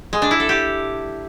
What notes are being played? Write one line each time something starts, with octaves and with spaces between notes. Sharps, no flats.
G#3
D4
E4
A4
G4